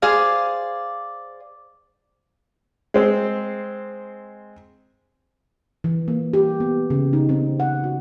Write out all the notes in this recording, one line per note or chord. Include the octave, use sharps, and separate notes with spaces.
G#4 C5 D5 F5
G#3 C4
E3
A#3
G4
B3
C#3
D#4
C4
F#5
F#4